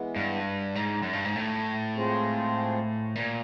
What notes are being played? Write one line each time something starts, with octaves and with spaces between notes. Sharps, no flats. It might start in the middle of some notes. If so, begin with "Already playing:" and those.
Already playing: E3 G#3 B3
G2
G#2
F#2
G2
G#2
A2
G#3 C4 F4 G#4 C5
A#2